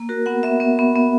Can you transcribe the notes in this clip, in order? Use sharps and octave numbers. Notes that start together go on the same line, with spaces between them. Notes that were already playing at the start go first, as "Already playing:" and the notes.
Already playing: A#3
F#4 A#4
B3 F#5
B3 E5
B3
B3
B3